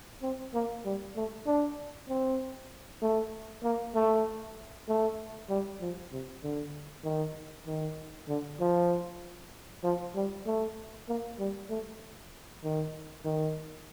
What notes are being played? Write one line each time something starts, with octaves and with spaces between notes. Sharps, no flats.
C4
A#3
G3
A3
D4
C4
A3
A#3
A3
A3
G3
F3
C3
D3
D#3
D#3
D3
F3
F3
G3
A3
A#3
G3
A3
D#3
D#3